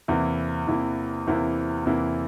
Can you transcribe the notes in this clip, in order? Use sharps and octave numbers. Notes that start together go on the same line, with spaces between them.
E2 C3 E3 A#3 E4
E2 C3 E3 A#3 E4
E2 C3 E3 A#3 E4
E2 C3 E3 A#3 E4